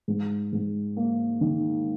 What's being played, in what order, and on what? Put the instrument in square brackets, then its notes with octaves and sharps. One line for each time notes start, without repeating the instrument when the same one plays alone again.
[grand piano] G#2
G#2
A#3
D#3